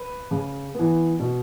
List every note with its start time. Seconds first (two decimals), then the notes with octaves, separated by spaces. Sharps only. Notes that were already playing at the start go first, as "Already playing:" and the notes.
Already playing: B4
0.31 C#3
0.75 E3 B3
1.19 B2